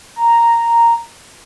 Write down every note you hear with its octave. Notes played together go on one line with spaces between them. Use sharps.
A#5